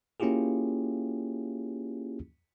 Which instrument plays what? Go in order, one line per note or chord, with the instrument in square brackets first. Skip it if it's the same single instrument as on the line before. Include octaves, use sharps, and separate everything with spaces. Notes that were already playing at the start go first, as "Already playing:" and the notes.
[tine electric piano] A#3 C#4 E4 F4 G4 G#4